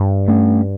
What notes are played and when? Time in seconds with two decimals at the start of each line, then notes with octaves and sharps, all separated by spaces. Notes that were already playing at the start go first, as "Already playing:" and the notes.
Already playing: G2
0.28 A3 C#4